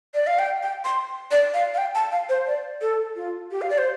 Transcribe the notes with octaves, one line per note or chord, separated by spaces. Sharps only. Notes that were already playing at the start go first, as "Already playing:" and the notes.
D5
F5
G5
G5
C6
D5
F5
F5
G5
A5
F5
C5
D5
A4
F4
G4
F5
D5
C5